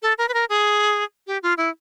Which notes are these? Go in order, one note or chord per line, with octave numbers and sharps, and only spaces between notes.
A4
A#4
B4
A#4
G#4
G4
F4
E4